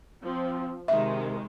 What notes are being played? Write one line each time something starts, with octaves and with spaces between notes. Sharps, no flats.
F3 C4
C3 D#3 G#3 E5